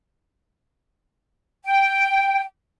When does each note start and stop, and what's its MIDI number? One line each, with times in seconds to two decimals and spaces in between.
1.64 2.42 79